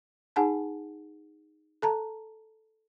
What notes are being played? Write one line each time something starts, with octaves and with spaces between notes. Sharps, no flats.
D#4 G#4 F#5 G#5 A5
A4 A5 A#5